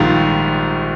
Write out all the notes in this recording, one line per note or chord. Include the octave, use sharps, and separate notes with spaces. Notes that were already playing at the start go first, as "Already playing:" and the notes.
Already playing: A#1 G#2 D#3 G3 F4